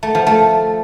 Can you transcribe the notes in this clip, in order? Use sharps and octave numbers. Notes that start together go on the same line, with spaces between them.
A3
F3
A3